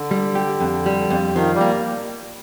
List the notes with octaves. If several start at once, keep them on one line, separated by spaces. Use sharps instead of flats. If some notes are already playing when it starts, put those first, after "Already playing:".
Already playing: D3
G3
G4
F2
G3
F2
D#3 F3
G3
A#3